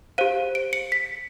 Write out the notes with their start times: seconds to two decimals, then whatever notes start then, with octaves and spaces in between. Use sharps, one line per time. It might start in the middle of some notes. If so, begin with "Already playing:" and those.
0.18 G4 C5 F5 D#7
0.55 D7
0.73 C#7
0.92 B6